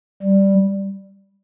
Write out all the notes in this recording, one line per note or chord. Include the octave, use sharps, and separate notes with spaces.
G3